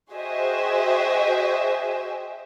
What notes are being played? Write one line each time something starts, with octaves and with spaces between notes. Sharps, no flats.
F#4 G#4 C5 D#5 E5 G5